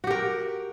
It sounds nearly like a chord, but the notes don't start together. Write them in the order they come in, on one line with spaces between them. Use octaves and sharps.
F#4 G4 A#4